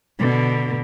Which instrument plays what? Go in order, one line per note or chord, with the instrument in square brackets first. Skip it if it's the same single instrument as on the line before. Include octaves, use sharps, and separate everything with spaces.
[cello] B2 D3